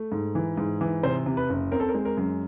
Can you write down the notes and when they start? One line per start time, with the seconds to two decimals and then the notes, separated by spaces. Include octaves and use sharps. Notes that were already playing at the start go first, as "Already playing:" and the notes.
Already playing: A3
0.12 G#2
0.35 E3
0.57 G#2
0.81 E3
1.03 C3 C5
1.26 C3
1.37 B4
1.50 F#1
1.72 C4 A#4
1.80 A4
1.89 A#4
1.94 G#3
2.05 A#4
2.17 F#2